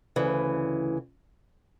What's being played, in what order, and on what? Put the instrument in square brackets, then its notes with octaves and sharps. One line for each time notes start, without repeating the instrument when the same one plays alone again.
[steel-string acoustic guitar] D2 C#3 E3